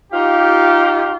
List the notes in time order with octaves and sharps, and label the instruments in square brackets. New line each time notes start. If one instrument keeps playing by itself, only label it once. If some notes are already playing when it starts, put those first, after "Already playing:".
[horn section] D#4 F4 G4